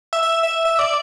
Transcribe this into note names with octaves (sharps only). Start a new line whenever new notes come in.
E5
E5
E5
E5
D5